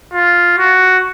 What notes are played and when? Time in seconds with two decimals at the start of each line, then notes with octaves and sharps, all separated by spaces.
0.14 F4
0.58 F#4